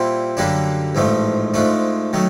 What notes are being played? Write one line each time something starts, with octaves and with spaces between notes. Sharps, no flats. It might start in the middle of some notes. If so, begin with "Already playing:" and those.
Already playing: A#2 G3 C4 E4
F#2 D3 G3 A#3 D4
A1 G#2 F3 A3
G#2 F3 A3 D4
D#3 F#3 A3